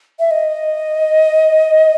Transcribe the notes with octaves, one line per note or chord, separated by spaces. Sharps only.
E5
D#5